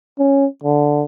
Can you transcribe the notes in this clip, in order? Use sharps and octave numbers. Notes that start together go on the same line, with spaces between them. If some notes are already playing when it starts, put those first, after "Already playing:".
C#4
D3